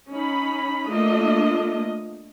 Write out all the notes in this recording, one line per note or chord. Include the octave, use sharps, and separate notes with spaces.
C#4 D#4 B5
A3 A#3 D4 F4 D#5